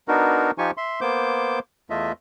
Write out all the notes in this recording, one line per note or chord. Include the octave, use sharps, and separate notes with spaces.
B3 D4 D#4 F#4 A#4
F3 D#4 F4 G4 G#5 C#6
E5 C6
A#3 B3 C5 D6 G6
E2 A3 F4 D#5 E5